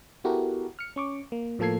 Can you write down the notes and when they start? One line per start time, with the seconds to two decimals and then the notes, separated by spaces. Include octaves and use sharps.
0.24 B3 E4 F#4 G4 A4 A#4
0.79 F6 C#7
0.96 C#4 C#6 D6
1.32 A#3
1.59 A2 F3 A#3 A4 G#6 C7